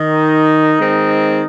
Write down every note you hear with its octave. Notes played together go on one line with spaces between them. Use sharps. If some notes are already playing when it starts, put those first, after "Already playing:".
Already playing: D#3 D#4
D#3 G#3 C4